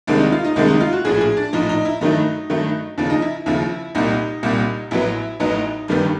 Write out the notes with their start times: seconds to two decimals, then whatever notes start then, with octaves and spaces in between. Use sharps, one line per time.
0.07 C2 C3 D#3 G#3 D4
0.19 D#4
0.32 F4
0.44 D#4
0.56 C2 C3 D#3 G#3 D4
0.68 D#4
0.80 F4
0.93 F#4
1.05 A#1 A2 F3 G#4
1.21 G#4
1.37 D4
1.53 A#1 A2 F3 D#4
1.69 D#4
1.85 E4
2.01 G2 D#3 F#3 A3 D#4
2.50 G2 D#3 F#3 A3
2.98 D#2 C#3 F3 D4
3.10 D#4
3.22 E4
3.46 D#2 C#3 F3 E4
3.95 C2 A#2 G3 D#4
4.43 C2 A#2 G3
4.91 A1 A2 F#3 B3 E4
5.40 A1 A2 F#3 B3 D#4
5.88 G1 G2 D#3 G3 B3